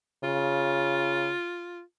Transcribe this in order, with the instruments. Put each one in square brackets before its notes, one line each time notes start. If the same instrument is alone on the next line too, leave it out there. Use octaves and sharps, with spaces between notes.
[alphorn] C#3 [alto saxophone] F4